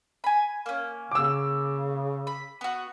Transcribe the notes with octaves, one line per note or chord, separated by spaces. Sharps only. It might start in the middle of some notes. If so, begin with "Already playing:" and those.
G#5 B5
A#3 C#4
C#3 D6 E6
B5
B3 F#4